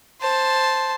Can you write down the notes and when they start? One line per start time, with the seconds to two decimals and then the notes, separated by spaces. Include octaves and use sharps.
0.21 C5 A5